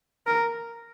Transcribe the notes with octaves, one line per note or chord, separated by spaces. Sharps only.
A#4